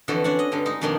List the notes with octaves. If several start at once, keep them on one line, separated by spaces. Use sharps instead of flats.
F2 D3 E3 F#4 A4
C#4 D4 F#5
D#5
G2 D3 G3
G#3 D#4
F2 B2 D#3 A#3 D4 C6